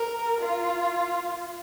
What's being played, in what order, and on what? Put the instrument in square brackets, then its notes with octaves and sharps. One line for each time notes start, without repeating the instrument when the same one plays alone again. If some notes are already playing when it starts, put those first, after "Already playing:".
Already playing: [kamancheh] A#4
F4